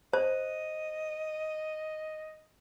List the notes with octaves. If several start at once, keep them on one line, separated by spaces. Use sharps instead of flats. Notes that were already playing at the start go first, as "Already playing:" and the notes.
C5 D#5